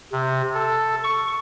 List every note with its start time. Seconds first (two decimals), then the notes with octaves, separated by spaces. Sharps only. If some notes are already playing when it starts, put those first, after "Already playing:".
0.12 C3
0.54 A4
1.04 C#6